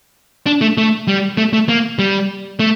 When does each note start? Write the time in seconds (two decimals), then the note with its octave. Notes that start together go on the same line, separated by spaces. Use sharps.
0.46 D4
0.61 A3
0.78 A3
1.07 G3
1.37 A3
1.53 A3
1.69 A#3
1.99 G3
2.59 A3